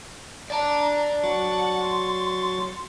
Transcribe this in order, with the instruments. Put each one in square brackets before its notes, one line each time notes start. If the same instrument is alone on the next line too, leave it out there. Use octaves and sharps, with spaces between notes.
[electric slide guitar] D5 A5 [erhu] A#5
[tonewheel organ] F#3 C#6 A6 [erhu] F#5
[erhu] C6